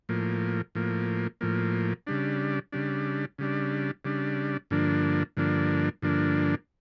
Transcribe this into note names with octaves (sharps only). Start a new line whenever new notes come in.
A2 F3 A#3
A2 F3 A#3
A2 F3 A#3
C#3 G3 D4
C#3 G3 D4
C#3 G3 D4
C#3 G3 D4
G2 D3 F3 A#3 D4
G2 D3 F3 A#3 D4
G2 D3 F3 A#3 D4